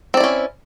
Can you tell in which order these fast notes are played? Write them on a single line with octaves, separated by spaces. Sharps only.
C4 D5 E4 C#4